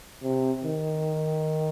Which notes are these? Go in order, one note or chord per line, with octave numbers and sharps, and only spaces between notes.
C3
D#3